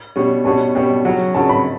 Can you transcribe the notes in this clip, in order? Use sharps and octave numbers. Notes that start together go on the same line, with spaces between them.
B2 G3 C#4
B2 G3 C#4 A5
B2 G3 C#4 G5
C#3 F#3 C#4
C#3 F#3 C#4 A5
B5